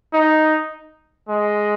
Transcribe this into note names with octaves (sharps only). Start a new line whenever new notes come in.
D#4
G#3